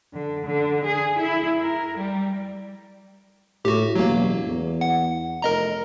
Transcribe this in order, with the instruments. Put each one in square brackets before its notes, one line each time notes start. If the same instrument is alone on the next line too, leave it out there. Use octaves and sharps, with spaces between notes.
[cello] D3
D3
G#4
E4
A#4
G3
[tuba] A2 [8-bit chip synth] F#4 G4
[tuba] E1 [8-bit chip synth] F#3 A#3
[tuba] E2
[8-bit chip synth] F#5
[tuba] F1 [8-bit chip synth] A#4 D#5 A#5